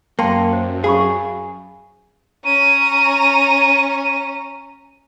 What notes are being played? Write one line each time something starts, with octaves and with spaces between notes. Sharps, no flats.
F#2 A#3 G5 A5 C6
C5
G#4 F5 B5 C#6
C#4 A#5 D#7